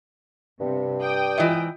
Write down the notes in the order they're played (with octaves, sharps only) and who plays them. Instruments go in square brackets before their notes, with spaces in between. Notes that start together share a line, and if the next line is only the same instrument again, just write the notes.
[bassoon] G2 [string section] C3
[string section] D5 G5 D#6
[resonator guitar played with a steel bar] G#2 E3 [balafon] F4 D#5 E5